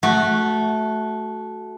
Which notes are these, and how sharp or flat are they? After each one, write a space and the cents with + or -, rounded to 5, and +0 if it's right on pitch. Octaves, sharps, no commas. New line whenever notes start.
A3 -15 F#4 +0